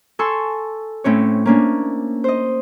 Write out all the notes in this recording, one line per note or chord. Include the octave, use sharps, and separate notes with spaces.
A4 G#5 C6 C#6 E6
A2 C4 C#4 C#5
A#3 C#4 D4
C5 D#5